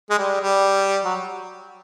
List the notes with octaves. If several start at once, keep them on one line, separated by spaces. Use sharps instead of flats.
G#3
G3
G3
F#3